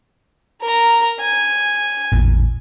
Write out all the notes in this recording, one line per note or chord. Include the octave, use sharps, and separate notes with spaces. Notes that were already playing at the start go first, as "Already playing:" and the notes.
A#4 A#5
G#5
A1 E2 A#2